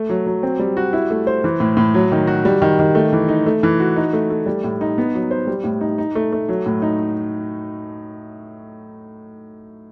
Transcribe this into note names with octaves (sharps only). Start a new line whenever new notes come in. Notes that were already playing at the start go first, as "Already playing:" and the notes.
Already playing: A3
F#3
F#3
C4
G3
F#4
E4
A3
C5
E3
A2
A2
F#3
D#3
F#4
G3
D#3
D#3
A3
E3
D#4
A3
E3
F#4
D#4
A3
A3
G3
A2
D#4
B3
F#3
C5
G3
A2
D#4
D#4
A3
A3
F#3
A2
D#4